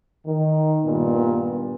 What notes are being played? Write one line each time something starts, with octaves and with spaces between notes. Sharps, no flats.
D#3
G2 A#2 B3